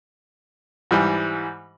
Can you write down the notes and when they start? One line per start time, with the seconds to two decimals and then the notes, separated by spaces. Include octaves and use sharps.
0.91 G#2 E3 G3